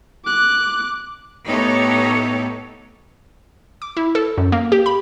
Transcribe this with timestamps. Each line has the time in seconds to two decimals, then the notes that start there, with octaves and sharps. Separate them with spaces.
0.25 D6 F#6
1.46 A2 B3 D#4 G4 A4 C#5
3.82 D6
3.97 E4
4.15 A4
4.38 F#2
4.52 A#3
4.72 G4
4.86 B5